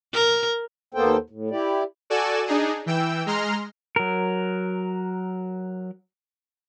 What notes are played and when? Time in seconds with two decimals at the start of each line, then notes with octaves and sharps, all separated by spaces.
0.13 A#4
0.94 D#2 A#3 B3 A4 C5 G5
1.30 A2
1.50 E4 G4 D5
2.10 F#4 A4 D5 G#5 E7
2.46 D4 D#4 G#4
2.86 E3 G5 E6
3.26 G#3 A#5 C6 F6
3.96 F#3 A#4